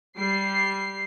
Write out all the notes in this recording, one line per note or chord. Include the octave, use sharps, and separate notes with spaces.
G3 C7